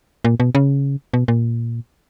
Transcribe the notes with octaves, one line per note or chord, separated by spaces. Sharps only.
A#2
B2
C#3
B2
A#2